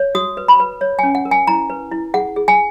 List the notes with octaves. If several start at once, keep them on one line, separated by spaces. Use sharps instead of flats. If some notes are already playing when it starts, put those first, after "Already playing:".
Already playing: C#5
F#4 D#6
B4
B5
B4
C#5
C#4 G#5
F#5
A#4
G#5
E4 A#5
B4
E4
G#4 F#5
G#4
G#5